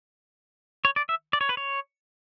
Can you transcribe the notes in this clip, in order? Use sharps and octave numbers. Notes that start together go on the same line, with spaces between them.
C#5
D5
E5
D5
C#5
B4
C#5